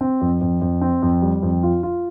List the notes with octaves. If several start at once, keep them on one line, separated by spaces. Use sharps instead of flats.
C4
F2
F2
F2
C4
F2
G3
F2
F4
F4